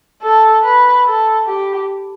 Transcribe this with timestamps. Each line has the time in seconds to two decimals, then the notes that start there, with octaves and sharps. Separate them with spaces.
0.22 A4
0.63 B4
1.05 A4
1.47 G4